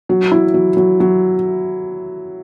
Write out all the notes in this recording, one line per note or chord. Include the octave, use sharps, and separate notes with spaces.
F#3
E4
F#3
F#3
F#3